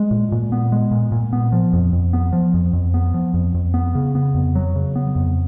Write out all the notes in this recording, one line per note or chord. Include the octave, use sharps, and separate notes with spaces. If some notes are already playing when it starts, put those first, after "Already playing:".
Already playing: G#3
A#2
A#2
B3
G#3
A#2
A#2
B3
F3
F2
F2
B3
F3
F2
F2
B3
F3
F2
F2
B3
C#3
B3
F2
F#3
C#3
B3
F2